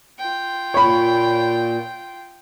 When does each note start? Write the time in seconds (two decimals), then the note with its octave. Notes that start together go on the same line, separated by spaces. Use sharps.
0.18 F4 G5
0.74 A#2 C#5 B5